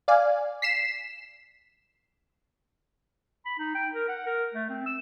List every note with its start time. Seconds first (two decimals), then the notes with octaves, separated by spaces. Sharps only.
0.08 D5 F5 G#5
0.62 B6 C7 E7
3.45 B5
3.58 D#4
3.75 G5
3.93 A#4
4.08 F#5
4.26 A#4
4.54 A3
4.69 C4
4.86 E6